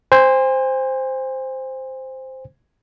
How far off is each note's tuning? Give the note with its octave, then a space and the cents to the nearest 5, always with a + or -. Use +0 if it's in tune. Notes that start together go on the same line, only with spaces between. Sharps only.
C5 +0 G#5 -40